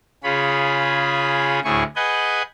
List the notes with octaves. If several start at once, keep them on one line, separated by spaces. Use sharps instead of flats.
C#3 F4 G#4 C#5 B5
D2 A2 E4 G#4 G#5 C#6
G#4 B4 D#5 F#5 G#5 G6